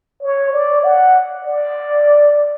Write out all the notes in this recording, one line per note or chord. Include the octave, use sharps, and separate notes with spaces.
C#5
D5
F#5
D5